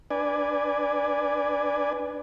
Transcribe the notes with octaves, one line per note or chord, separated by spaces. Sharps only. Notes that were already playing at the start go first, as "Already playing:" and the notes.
D4 B4 D5 G#5